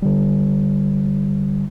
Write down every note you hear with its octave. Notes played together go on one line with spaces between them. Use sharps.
D3 G3